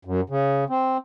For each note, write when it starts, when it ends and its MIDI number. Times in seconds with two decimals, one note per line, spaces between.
0.05 0.21 42
0.30 0.64 49
0.70 0.97 60